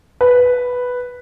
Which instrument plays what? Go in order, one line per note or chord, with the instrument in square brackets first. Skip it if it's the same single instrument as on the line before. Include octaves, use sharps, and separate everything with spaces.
[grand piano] B4